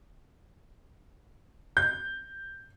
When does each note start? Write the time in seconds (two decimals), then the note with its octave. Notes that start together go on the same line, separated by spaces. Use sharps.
1.77 G6